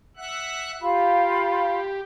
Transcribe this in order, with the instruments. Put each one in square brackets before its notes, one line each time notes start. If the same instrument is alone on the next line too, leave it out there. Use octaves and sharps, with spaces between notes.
[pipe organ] E5 F#5 F#6
[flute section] F4 F5 B5 [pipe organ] G4